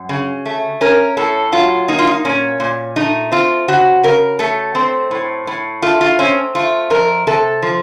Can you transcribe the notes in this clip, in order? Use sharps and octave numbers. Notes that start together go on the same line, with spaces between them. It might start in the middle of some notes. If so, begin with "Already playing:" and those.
Already playing: F#2
C#3
A3
C#4 A#4
A2 A4
F#3 F4
A#3 D#4
F4
D#4
A#2 C#4
A#2
A3 D#4
C4 F4
C#3 F#4
C#3 A#4
A3 A4
C4
A2
A2
A3 F4
F4
C4 C#4
A3 F4
F2 A#4
C3 A4
F3